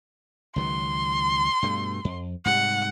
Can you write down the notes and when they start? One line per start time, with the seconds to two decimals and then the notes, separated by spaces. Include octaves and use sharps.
0.56 C#2 D#3 F#3 C6
1.63 G2 B2 A3
2.05 F2
2.45 G#2 C3 G3 F#5